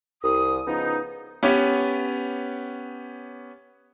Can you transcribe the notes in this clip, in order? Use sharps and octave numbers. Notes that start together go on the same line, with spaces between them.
C2 D#6
C#3 F3 B3 D#4
B3 C#4 G4 B4 C#5